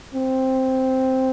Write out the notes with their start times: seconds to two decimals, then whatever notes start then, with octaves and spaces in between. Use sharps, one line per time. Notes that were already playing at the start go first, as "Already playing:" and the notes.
0.14 C4